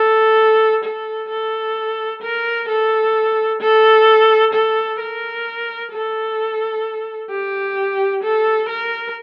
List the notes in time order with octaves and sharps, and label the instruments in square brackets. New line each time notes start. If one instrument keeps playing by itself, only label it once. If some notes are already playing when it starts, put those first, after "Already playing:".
Already playing: [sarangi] A4
A4
A4
A#4
A4
A4
A4
A#4
A4
G4
A4
A#4